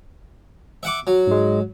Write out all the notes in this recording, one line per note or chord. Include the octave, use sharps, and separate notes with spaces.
E5 F#5 D6
F#3
G#2 G#3